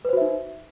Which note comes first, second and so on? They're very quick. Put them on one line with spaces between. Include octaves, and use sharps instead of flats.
B4 C5 F#4 E5 D#4